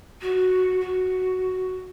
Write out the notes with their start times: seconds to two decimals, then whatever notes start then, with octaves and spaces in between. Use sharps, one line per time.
0.21 F#4
0.80 F#4